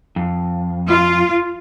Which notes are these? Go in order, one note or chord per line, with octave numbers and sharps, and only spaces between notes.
F2
F4